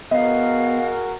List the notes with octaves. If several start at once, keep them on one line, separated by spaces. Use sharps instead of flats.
B3 F#4 G#4 A#4 D#5 F5